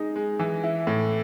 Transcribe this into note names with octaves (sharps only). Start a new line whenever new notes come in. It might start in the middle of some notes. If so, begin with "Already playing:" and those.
Already playing: G#3 D#4
G#3
E3
E4
A2